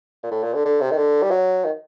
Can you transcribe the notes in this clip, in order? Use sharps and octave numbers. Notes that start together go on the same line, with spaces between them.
A#2
A2
A#2
D3
D3
C3
D#3
D3
G3
F#3
D#3